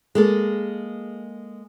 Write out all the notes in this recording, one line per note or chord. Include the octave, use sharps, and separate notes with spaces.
G#3 A#3 A4